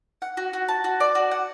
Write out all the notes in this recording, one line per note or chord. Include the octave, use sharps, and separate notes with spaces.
F#5
F#4
F#4
A5
F#4
D5
F#4
F#5